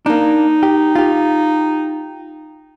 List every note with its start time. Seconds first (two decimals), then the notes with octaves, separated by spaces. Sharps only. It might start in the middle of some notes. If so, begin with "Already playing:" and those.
0.06 A#3 D4 D#4
0.63 G4
0.95 F4 G4